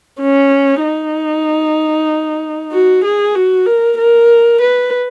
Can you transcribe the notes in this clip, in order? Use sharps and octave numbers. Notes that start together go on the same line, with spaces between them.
C#4
D#4
F#4
G#4
F#4
A#4
A#4
B4